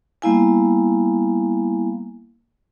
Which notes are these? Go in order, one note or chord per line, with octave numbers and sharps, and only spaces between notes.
G3 A#3 B3 E4 F5 G#5